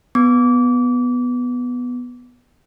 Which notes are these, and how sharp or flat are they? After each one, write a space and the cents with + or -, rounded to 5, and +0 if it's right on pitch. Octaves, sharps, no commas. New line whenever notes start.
B3 +0 D6 -25